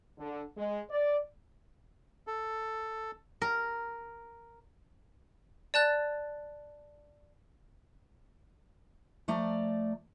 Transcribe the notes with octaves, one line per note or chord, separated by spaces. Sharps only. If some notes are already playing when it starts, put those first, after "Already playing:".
D3
G#3
D5
A4
A#4
D5 A5 F#6 A6
F3 A3 D5 A#5